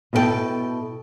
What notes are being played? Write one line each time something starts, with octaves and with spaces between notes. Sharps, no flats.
B2 E4 A4 A#4 G5 A5